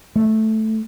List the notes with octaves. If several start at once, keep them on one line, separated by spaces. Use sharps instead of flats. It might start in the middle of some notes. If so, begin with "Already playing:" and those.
A3